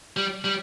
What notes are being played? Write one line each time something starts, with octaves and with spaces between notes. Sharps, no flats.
G3
G3